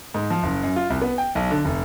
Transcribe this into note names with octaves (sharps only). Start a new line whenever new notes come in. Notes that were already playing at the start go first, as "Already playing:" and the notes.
G#2
F3
F#1
F#2
F4
C2
B3
G5
B1
D3
F1